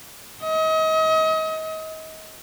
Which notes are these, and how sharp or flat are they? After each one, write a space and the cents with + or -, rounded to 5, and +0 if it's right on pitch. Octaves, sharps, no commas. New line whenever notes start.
D#5 +35